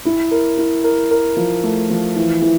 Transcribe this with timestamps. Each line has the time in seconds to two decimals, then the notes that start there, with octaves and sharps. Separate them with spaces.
0.05 E4
0.31 A#4
0.58 E4
0.84 A#4
1.11 A#4
1.37 F3
1.64 A3
1.90 F3
2.16 E3
2.42 E3